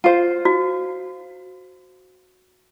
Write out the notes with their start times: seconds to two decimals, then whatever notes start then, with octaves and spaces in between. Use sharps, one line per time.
0.04 F4 C5
0.45 F#4